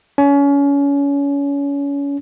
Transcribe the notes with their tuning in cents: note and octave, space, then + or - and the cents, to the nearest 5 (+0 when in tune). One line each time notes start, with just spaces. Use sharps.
C#4 +30